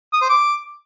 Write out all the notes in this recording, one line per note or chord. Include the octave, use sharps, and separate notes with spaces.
D#6
C5
D6